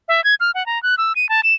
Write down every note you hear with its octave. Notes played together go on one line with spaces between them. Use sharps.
E5
G#6
F6
F#5
A#5
F#6
E6
D#7
A5
E7